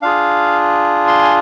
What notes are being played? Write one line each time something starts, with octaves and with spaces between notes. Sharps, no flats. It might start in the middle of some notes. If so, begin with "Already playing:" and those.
D4 F4 G#4 F5
C6
G#5